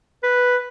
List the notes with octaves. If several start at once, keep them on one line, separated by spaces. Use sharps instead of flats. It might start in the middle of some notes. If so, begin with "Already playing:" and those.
B4